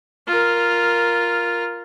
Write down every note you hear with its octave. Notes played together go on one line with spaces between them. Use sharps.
F4 A#4